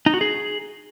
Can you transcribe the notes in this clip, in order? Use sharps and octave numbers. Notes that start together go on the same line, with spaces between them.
D#4
F#4
G#4